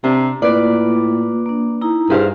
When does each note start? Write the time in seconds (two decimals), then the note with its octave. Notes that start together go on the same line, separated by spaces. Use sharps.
0.04 C3 D4 A#5
0.42 A2 A#3 F4 B4 D5
1.46 A#3 D4
1.81 D#4 E4 A#5
2.10 G2 G#4 C5 F5